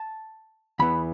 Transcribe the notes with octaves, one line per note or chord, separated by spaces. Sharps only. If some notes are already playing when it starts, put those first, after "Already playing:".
Already playing: A5
E2 E3 B3 B5